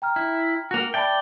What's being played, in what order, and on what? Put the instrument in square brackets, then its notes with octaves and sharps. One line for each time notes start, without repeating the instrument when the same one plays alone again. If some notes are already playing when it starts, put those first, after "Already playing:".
[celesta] G5 A#5 F6
[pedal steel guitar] E4
A#3 F#4
[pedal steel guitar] D5 G5 [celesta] E5 A5 B5